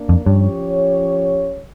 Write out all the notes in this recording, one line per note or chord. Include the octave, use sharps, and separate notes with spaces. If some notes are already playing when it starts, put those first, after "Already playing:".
Already playing: A#3 D4
F2
G2 F3 C#4 G4 C#5